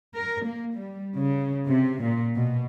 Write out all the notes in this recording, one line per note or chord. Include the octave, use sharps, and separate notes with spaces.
A#4
A#3
G3
C#3
C3
A#2
B2